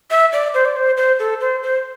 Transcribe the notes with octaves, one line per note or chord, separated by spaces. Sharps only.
E5
D5
C5
D5
C5
C5
A4
C5
C5